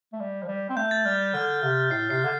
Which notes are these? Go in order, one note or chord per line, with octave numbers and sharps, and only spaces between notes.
A3
G3
F3
G3
C4
A3 G6
A6
G3 F6
D3 F6
C3
A2 C7
C3 C7
D3